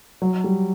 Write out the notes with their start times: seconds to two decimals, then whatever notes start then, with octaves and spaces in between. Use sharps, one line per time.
0.22 F#3
0.44 G3